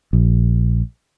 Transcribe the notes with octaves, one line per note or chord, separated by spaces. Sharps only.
A#1